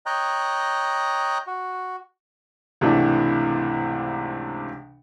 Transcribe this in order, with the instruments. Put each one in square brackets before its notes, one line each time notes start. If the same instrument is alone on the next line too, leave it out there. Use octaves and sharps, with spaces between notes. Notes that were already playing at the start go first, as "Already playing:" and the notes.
[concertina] C#5 D#5 G5 A#5 F#6
F#4
[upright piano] C#2 G#2 C3 E3 A3 D4